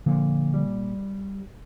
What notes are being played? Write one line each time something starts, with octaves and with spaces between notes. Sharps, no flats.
A#2 D3 F3
G3